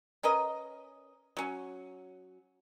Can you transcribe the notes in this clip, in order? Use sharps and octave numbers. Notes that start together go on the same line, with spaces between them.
C#4 A#4 B4 D#5
F#3 C#4